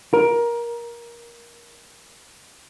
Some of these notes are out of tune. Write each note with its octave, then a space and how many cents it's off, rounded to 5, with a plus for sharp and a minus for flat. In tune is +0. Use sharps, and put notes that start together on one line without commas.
A#4 +20